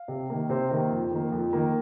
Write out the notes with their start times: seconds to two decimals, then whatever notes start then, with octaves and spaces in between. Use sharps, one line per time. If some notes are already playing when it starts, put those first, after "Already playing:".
Already playing: F5
0.08 C3
0.30 D#3 A#3
0.50 C3 C5
0.71 D#3 A#3
0.91 F2
1.11 D#3 A#3
1.32 F2
1.53 D#3 A#3